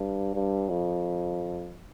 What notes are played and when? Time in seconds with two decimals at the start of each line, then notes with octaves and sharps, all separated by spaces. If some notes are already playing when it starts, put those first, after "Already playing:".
Already playing: G2
0.35 G2
0.69 F2